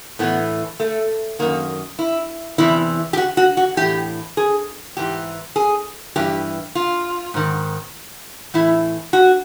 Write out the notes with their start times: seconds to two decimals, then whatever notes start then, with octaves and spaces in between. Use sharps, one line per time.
0.19 A2 E3 B3
0.80 A3
1.39 F#2 D#3 A#3
1.99 E4
2.58 E2 C3 E3 E4
3.13 G4
3.17 F#4
3.37 F#4
3.57 F#4
3.77 A2 E3 G4
4.37 G#4
4.97 G#2 E3 G4
5.56 G#4
6.16 G2 E3 G4
6.75 F4
7.34 G#2 D#3
8.54 A2 E3 E4
9.13 F#4